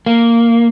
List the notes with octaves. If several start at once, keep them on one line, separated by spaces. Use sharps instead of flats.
A#3